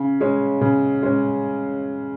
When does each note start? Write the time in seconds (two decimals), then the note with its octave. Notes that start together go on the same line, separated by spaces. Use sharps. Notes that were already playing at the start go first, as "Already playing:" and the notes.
Already playing: C#3
0.21 G#3 C#4
0.61 C#3
1.03 G#3 C#4